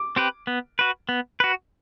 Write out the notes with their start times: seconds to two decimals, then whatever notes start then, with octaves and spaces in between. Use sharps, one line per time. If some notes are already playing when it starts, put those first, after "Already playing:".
Already playing: D6
0.16 C4 G4 B4
0.47 B3
0.79 F#4 B4
1.09 B3
1.40 F#4 B4